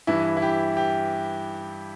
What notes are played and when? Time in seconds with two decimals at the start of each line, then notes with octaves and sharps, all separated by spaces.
0.07 G2 E3 E4
0.37 E4
0.42 G4
0.77 G4